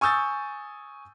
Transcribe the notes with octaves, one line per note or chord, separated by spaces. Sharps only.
G#5 C#6 D#6 E6 G6 A6